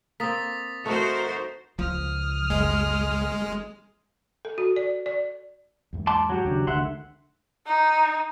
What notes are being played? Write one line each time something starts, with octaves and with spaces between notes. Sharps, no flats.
A#3 C4 D#6 A6 B6
A3 D#4 F#4 A#4 C5
C#2 F3 D#6 F6
F#1 G#3
A4
F#4
D5
D5
E2 G#2
A5 C6 D6
F#3 F#4 G4
D#2 C#3 D4
C#2 D3 D#3 E5 F#5 C6
D#4